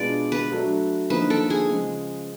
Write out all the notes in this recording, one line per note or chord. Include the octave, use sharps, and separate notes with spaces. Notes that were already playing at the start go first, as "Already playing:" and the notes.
Already playing: B2 G#3 B3 D4 F4 D5
B4
F#3 A3 D4
D3 F3 A#3 D#4 B4
A4
G#4
C#3 F3 G#3